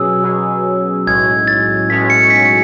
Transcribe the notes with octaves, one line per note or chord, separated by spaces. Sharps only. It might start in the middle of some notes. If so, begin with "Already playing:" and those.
Already playing: B2 F#3 C#4 G#4 E6
B2 F#3 C#4 G#4
B1 A2 G#3 C#4 F#4 G#6
A6
B1 A2 G#3 C#4 F#4 B6
C#7
B6